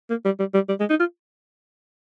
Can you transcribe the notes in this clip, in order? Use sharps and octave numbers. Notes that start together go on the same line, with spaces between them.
A#3
G3
G3
G3
G3
G#3
D#4
F4